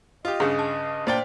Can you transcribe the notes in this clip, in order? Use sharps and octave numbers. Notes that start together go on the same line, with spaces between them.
F4 G4 D#5
G2 C#3 G#4
A5
A#2 D4 C5 D5 G5